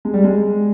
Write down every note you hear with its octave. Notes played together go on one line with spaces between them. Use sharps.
G#3
G3
G#3